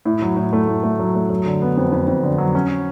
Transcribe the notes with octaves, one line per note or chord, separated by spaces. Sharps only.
A2
F#3
A2
A3
A2
A3
F#3
A3
F#3
D3
B3
F2
F2
F2
D3
F#3
C#4